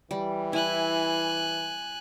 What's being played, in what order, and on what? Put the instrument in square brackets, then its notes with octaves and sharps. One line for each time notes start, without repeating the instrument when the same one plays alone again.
[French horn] E3 [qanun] G3
[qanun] E4 [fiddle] G#5 F#6